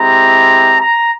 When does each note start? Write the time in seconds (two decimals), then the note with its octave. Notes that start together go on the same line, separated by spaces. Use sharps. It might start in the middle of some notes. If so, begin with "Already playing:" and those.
Already playing: G#3 C4 E4 G4 A#5
0.78 A#5